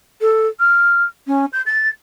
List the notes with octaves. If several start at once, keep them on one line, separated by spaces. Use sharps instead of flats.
A4
F6
C#4
G6
A6